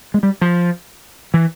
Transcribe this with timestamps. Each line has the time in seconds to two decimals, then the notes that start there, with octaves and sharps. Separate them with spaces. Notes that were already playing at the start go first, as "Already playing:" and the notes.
0.14 G#3
0.23 G3
0.41 F3
1.34 E3